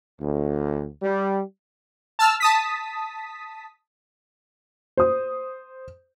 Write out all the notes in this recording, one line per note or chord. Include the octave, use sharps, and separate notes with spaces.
D2
G3
A5 E6 F6
A5 D#6 B6
C5 D#6